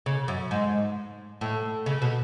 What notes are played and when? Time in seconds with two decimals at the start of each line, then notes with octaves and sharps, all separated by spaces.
0.06 C#3
0.28 F#2
0.51 G#2
1.41 A2
1.86 C#3
2.02 B2